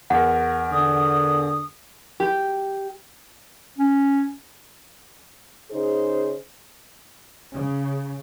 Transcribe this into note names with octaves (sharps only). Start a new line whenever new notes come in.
E2 A#4 F#5
D3 D#6
G4
C#4
C#3 D#4 G#4 C5
C#3